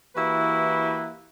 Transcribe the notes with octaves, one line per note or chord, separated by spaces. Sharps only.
E3 A#3 E4 F#4 G4 B4